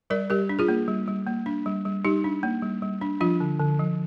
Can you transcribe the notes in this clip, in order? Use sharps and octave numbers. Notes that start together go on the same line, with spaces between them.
G3 A#4 D5
G3 G4 A#4
D4
F4 G#4
A#3
G3
G3
A#3
D4
G3
G3
G3 D#4 G4
D4
A#3
G3
G3
D4
F3 D4 F4
D3
D3
F3